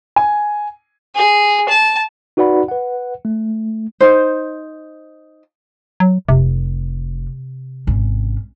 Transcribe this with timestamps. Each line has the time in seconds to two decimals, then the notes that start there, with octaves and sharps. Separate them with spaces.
0.16 G#5
1.15 G#4
1.69 A5
2.37 D#4 F#4 B4 D5 F#5 B5
2.68 B4 F#5
3.25 A3
4.01 D#4 C5
6.00 F#3
6.29 F1 C3
7.87 G#1 C#4